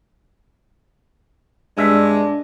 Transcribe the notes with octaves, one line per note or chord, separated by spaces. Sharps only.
G2 G#3 D4 E5